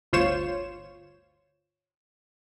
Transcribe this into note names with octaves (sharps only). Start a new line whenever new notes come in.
G1 D2 F4 C5 C#5 E7